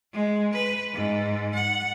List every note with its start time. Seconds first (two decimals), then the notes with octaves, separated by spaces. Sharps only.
0.13 G#3
0.53 B4
0.93 G#2
1.54 F#5